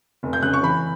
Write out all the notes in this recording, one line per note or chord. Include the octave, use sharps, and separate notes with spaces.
F1
G6
C#3 F#6
C#6
E3 B5